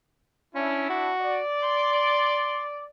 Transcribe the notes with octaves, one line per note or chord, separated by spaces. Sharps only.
C#4 D4 E4
F#4
D5
C6